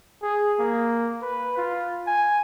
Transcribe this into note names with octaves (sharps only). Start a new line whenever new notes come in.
G#4
A#3
B4
F4
G#5